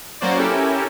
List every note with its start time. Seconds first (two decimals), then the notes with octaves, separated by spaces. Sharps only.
0.21 F#3 A#3 C#4 F#4 C5 D5
0.38 C#4 E4 G4 A4 A#4